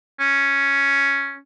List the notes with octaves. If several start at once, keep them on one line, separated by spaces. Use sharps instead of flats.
C#4